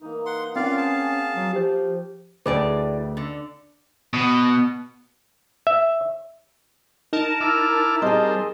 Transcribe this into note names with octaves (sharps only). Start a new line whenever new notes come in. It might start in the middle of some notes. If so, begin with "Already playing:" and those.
E3 A#3 D#4
F#5 C6
C4 C#4 F4 A#4 D5 F5 F#5
G#4 F5 A5
F#3
F3 G4 C5
D2 A2 G#4 B4 D5 D6
D3
B2
E5
D#4 A#4 A5
E4 D6 F6
G3 C4 G#4 D#5